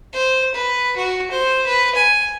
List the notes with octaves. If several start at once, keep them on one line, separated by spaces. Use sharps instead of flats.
C5
B4
F#4
C5
B4
G#5